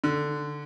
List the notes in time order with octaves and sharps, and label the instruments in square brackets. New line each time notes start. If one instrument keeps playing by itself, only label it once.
[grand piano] D3